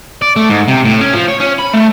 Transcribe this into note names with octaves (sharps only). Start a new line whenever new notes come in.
D5
A3
G#2
C3
A2
C#4
F3
C#5
C#4
B5
A3